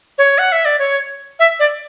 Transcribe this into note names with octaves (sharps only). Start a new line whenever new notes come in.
C#5
F#5
E5
D5
C#5
E5
D5